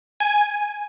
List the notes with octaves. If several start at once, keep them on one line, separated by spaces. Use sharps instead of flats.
G#5